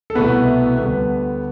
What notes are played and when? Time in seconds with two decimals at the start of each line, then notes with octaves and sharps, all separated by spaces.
0.10 A4
0.15 C2 B2 A3 B3 E4 B4
0.77 D2 D3 G3 B3 B4